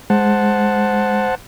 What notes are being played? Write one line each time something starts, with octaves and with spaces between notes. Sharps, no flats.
G#3 C5 F#5 A5